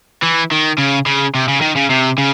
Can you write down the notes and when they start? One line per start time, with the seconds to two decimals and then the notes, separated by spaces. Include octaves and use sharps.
0.22 E3
0.51 D#3
0.78 C#3
1.06 C#3
1.35 C3
1.49 C#3
1.62 D#3
1.77 C#3
1.90 C3
2.18 C#3